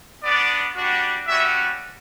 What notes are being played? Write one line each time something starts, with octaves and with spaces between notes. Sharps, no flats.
B3 D4 F#4 D5
G3 D4 F#4
G3 C#4 F#4 E5